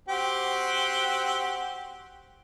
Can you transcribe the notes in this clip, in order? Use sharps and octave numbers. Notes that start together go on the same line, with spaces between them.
C4 F#4 G4